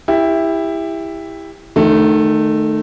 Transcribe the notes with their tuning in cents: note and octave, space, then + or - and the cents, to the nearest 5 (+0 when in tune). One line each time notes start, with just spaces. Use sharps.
E4 +0 G4 +25
D#3 -25 A3 +0